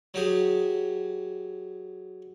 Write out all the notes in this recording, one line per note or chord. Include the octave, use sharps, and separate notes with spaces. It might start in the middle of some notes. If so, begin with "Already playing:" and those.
F#3 G4 G#4